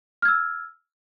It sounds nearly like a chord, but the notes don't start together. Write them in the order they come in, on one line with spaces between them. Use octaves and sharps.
F6 G#6 E6